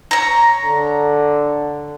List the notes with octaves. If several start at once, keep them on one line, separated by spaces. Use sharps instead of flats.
C#5 A#5
D3